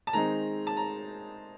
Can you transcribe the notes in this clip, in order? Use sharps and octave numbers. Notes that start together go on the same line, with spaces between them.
A5
D#3 G#3 C4 D#4 A#5
A5
A#5